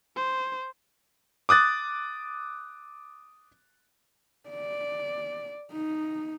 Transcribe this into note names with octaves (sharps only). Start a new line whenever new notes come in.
C5
D6 D#6 F#6 A6
D5
D#4